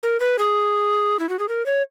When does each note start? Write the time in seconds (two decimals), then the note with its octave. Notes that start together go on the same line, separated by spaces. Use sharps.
0.03 A#4
0.20 B4
0.39 G#4
1.19 E4
1.29 F#4
1.39 G#4
1.49 A#4
1.66 C#5